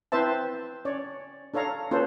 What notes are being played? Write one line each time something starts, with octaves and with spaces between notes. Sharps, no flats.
C4 E4 B4 C5 E5 A5
C#4 C#5 D5
D4 A4 C#5 F5 A#5
A#3 C#4 F4 A4 B4 C5